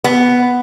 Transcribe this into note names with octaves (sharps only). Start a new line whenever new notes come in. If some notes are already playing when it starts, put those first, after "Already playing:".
B3